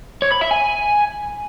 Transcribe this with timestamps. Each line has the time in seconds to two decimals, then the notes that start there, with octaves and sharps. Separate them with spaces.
0.22 C#5
0.32 B5
0.41 E5
0.51 G#5